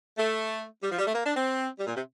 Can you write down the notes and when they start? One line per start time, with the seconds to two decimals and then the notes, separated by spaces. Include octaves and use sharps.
0.18 A3
0.82 G3
0.91 F3
0.99 G3
1.07 A3
1.15 A#3
1.25 D4
1.37 C4
1.80 G3
1.87 A#2
1.96 C3